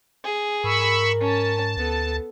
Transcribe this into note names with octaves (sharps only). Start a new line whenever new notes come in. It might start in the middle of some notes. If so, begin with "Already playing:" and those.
G#4
G#2 A#4 B5 C#6 E6
C#4 A5
D2 B3 A4